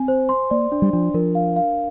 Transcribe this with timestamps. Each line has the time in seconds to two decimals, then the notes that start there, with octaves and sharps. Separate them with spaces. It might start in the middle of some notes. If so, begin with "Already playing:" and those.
Already playing: C4 G#5
0.08 C5
0.29 C6
0.51 A#3 D5
0.72 D4
0.82 G3
0.93 F3 D4
1.14 F3 A#4
1.35 F5
1.56 F5